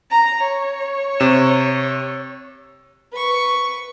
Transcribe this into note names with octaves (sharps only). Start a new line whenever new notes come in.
A#5
C#5
C3 E7
B4 C#6